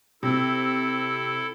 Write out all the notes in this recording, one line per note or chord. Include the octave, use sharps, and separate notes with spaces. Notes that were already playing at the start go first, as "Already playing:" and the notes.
C3 E4 A4